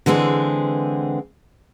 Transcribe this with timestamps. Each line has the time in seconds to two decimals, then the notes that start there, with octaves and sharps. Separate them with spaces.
0.06 D3 E3 G#3 C4 G#4